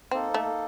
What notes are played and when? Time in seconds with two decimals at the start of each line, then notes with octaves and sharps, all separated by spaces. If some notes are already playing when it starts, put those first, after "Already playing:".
0.11 A#3 C4 D#4 A4
0.34 A3